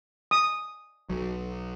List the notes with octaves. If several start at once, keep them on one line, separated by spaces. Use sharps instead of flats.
D#6
B1 F#3